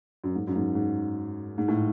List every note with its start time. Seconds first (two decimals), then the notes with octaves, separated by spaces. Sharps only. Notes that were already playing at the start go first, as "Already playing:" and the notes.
0.24 F#2
0.35 G#2
0.47 F#2
0.56 G#2
0.75 G#2
1.58 G#2
1.68 A2